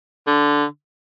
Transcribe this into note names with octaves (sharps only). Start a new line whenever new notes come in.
D3